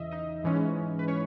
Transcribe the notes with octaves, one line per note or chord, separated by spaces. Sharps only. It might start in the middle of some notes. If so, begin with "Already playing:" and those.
Already playing: E2 C#3 E3 D#5 E5
D#4 D#5
G#2 E3 G#3 C#4
B4
C#4 C#5